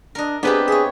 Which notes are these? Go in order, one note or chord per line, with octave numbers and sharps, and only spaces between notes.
D4 A#4 D#5
B3 C4 D4 G4 G#4 B4
G#4 C#5 E5